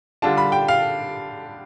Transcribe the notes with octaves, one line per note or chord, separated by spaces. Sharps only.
D3 G3 D4 F4 A5
B5
G5
F5